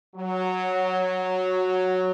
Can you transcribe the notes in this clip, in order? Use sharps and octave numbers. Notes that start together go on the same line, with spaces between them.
F#3